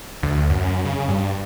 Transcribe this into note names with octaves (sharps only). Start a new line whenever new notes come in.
D2
F#2
C#3
G2